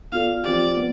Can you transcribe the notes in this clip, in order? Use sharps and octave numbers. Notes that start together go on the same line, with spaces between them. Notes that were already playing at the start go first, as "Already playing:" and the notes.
B3 F4 A4 D5 F5
F3 C4 G4 D5
B3